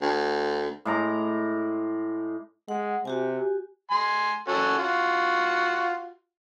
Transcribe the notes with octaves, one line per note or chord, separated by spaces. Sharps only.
D2
A2 G#3 A#5 D6
G#3 F#5
C3 F#4 G4 G#5
G#5 C6
C#4 F#4 A4
F4 F#4